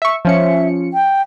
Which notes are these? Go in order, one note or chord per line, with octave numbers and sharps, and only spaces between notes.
E5 C#6
F3 C#4 E5 C#7
G5